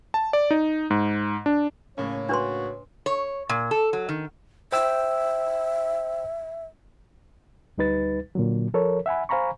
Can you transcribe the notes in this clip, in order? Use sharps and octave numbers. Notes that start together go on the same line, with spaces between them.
A5
D5
D#4
G#2
D4
A2 C#3 A#3 C#4 C#5
D4 F#4 B4 C6
C#5
A#2
A4
F#3
D#3
C5 E5 G5 E6
D2 G3 D#4 B4 A6
A#2 D3 F#3
F3 A4 A#4 C#5
E5 F#5 G#5 B5
C5 F5 G#5 A#5 B5 C#6